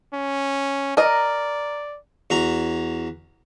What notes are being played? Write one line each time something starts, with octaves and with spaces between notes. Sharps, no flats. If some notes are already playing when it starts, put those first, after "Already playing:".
C#4
A#4 D5 D#5
E2 F#4 A#5